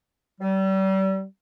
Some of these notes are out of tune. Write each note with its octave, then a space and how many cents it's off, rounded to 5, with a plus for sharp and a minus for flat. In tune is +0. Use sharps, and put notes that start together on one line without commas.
G3 -35